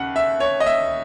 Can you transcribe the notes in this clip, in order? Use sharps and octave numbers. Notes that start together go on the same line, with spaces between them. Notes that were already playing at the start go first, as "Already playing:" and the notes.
Already playing: D#2 C#3 F#5
E5
C#5
D#5
E5